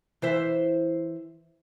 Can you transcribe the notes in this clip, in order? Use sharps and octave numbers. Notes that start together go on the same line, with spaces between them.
E3 C5 E5